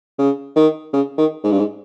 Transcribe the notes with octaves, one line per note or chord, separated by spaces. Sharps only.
C#3
D#3
C#3
D#3
G#2
G2
G#2